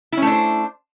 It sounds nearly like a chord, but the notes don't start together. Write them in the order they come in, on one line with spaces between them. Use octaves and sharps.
E4 C#4 A3 D4 C5